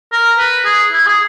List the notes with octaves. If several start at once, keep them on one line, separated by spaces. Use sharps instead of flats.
A#4
B4
G#4
E4
G#4